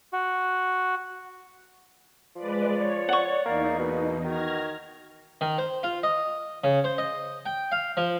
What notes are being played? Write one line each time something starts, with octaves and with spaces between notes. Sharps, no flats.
F#4
F3 G#3 B4 D5
C#5 D5
F#5 C#6
E2 A#3 D#4
B2 A#3
D#3 F#4 F6 G#6 A#6
D#3
C5
F4
D#5
C#3
C5
D#5
G5
F5
F3